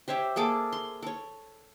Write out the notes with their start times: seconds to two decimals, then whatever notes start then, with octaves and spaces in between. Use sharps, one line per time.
0.08 G4 C5 C#5 E5
0.36 A#3 G#4 A4 D6
0.73 C6
1.03 A4 C#5